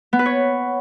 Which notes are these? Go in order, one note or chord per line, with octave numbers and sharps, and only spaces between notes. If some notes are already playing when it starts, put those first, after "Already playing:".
B3
B4
C#5